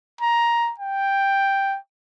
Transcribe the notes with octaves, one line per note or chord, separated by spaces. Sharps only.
A#5
G5